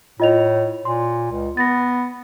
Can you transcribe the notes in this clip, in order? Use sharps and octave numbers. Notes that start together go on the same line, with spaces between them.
A2 F4 D#5 F7
A#2 C6
C#2
B3 A6 A#6